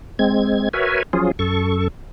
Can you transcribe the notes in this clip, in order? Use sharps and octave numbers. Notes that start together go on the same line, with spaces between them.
G#3 C4 G#6
F#4 A#4 B4 C#5 E5 G#5
F3 F#3 C#4 F4 G#4
F#2 A4 C#6